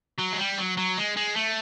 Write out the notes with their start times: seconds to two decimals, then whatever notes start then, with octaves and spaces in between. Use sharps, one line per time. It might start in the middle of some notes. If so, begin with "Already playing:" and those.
0.19 F#3
0.33 G#3
0.39 G3
0.58 F#3
0.77 F#3
0.97 G#3
1.17 G#3
1.36 A3